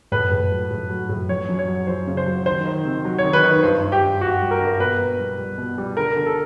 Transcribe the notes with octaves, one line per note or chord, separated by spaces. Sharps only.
A2 B4
A2
F#3
A2
F#3
A2
F#2 C#5
F#2
C#5
F#3
F#2 C5
C#3
C5
F#3
D#3 C5
D#3
C3
F#3
C#5
D#3
B4
D#3
G2 C5
G2
G4
G2
G2 F#4
G3
A#4
G2
B2 B4
B2
G3
G3
B2
G3
D3 A#4
D3
A4